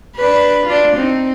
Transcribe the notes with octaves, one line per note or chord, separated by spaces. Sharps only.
D4 B4
D4 F4
C4 D#4